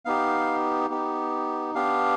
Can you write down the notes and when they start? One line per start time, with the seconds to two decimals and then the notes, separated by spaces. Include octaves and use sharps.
0.05 B3 D#4 G4 F5
0.90 B3 D#4 G4
1.75 B3 D4 G4 F5